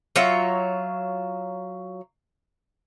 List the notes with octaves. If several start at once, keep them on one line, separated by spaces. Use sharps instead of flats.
F#3 F4 C#5 E5